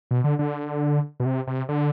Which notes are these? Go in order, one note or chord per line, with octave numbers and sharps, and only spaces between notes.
B2
D3
D3
B2
C3
C3
D3